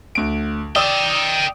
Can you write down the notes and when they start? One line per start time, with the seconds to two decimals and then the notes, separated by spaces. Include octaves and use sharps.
0.15 D2 D7
0.76 D5 D#5 G5 D#6 E6